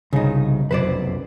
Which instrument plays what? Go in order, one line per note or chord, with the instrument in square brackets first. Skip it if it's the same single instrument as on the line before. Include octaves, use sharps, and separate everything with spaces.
[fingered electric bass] G1 C2 [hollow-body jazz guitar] C#3 D#4
[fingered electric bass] F1 B1 F#2 [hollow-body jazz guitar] B4 C5 D5